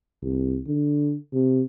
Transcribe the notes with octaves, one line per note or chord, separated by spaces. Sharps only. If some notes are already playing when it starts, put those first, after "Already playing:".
C2
D3
C3